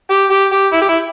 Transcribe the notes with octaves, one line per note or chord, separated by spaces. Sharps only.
G4
G4
G4
E4
G4
E4